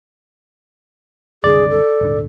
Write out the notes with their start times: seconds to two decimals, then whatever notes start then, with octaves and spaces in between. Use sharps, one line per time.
1.44 F#1 C2 D3 G#4 D5
1.70 A4
2.01 D#1 G#1 D3